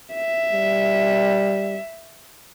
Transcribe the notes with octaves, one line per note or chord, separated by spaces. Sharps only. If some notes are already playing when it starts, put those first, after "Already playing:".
E5
G3